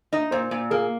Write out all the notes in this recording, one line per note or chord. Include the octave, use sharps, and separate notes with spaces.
D#4 D#5
A#2 C5
A#2
A#3 G#4